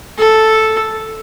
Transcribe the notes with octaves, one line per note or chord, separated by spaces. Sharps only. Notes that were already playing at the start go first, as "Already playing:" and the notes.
A4